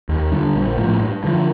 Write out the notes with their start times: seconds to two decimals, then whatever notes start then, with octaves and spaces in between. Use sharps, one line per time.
0.09 D#2
0.31 D3 G3 D4
0.54 A#1
0.77 A2 F3
1.00 G2
1.24 D3 F3